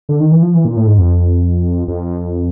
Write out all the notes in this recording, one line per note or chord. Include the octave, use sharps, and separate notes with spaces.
D3
D#3
E3
F3
E3
A#2
A2
G#2
F2
F2